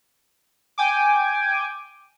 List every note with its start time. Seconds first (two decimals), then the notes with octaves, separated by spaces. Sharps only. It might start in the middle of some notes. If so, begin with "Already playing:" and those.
0.78 G5 G#5 D6